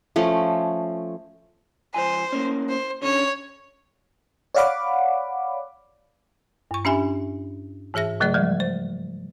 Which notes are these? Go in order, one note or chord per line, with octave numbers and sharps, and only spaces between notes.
F3 A3 C#4
C#2 F3 C5 G#5
A2 A#3 C#4
C5
D3 C#4 C#5
C#5 D5 F5 F#5 B5 D6
G2 C#6
C#4 D4 G4 E5 G#5 B5
G#2 E3 G#4 E5 A#6
C#3 F#3 A3 G#4 D5
F3 G3 G#3
C5